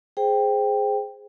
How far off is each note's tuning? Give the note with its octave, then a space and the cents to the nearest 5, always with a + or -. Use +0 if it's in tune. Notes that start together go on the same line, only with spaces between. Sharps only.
G#4 +0 C5 +0 G5 +5